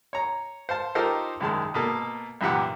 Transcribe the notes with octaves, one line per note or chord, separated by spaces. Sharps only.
C#5 A#5
C5 F5 A5
D#4 F4 G4 A4 A#4 C5
C2 F#2 D#3 G#3 A5 C6
B2 A#3 A4
B1 F#2 A#2 E3 G4 F#5